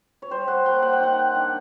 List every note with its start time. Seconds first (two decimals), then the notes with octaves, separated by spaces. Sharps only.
0.22 C#5
0.30 G3 C5
0.48 F#5
0.65 A#3 G5
0.82 F#5
0.93 G5
1.00 D#3 F#5
1.35 D4